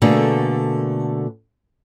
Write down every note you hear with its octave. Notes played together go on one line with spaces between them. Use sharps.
B2 D3 A3 A#3 G#4